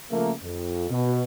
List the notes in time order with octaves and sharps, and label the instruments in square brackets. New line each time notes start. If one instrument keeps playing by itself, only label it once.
[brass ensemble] C#3 F3 A3 A#3
F2
B2